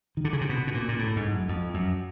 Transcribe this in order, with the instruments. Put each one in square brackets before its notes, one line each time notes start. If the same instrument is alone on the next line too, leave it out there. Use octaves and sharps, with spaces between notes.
[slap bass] D#3
D3
C#3
C3
B2
B2
A#2
A#2
A2
G#2
F#2
F2
F#2